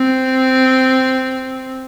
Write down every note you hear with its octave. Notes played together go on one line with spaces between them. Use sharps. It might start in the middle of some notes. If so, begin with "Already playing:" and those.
Already playing: C4